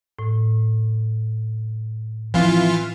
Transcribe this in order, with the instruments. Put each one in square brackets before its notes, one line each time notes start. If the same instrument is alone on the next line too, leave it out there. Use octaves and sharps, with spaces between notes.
[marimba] A2
[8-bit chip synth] E3 F4 [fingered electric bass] F3 C4